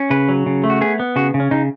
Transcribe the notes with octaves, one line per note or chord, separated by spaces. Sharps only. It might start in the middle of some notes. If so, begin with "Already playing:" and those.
Already playing: C#4
C#3 B4
F#3
C#3
A3
F#4
B3 G#4
B3
C#3 F#4
C#3
C#4
C#3 D#4